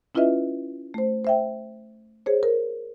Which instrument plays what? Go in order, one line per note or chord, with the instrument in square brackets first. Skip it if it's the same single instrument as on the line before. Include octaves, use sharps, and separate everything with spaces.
[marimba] C#4 E4 F4 B4 D#5 E5
A3 C5
C5 E5 G5
G#4 C5 C#5
A#4